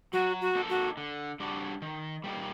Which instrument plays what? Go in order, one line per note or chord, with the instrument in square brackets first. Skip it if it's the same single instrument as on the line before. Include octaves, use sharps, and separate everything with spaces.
[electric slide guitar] F#3 [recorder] F#4
[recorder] F#4
[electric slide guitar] A#3 D#4 A4
[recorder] F#4
[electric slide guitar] D3
G3 D4 F#4
D#3
G3 A#3 D#4